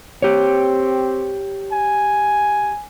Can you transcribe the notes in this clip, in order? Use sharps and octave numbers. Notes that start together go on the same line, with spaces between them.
C4 G4 C#5
G#5